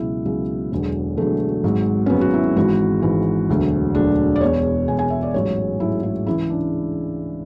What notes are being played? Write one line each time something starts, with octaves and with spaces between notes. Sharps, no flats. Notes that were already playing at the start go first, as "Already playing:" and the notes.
Already playing: C#2 B2 F#3 E4
C#2 B2 F#3
E1 E2 D3 F#3
E1 E2 D3 F#3 A3
G#1 G#2 F#3
C#4
G#1 G#2 F#3 B3
F#4
E4
G#1 G#2 E3 F#4
G#1 G#2 E3
E1 D2 D3 F#3
E1 D2 D3 F#3 D4
D5
E1 E2 B2 C#5
E1 E2 B2 G#5
G#5
E5
D5
A1 G#2 F#3 C#5
A1 G#2 F#3 E4
E4
C#2 C#3 E3 E4
D4